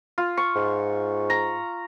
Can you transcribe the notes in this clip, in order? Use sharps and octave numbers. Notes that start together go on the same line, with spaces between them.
F4
C#6
G#2
A#5